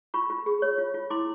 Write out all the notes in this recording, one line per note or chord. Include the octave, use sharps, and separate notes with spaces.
F4 B5 C#6
F4
G#4
C#5
F4
F4
E4 C6 D6